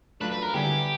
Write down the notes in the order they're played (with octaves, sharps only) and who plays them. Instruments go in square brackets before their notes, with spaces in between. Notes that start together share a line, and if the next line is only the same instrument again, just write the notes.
[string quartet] F#3 A3 D4 F4 [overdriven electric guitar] B4
[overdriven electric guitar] B4
A#4
[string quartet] D3 G3 B3 E4 G#4 [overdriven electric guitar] G4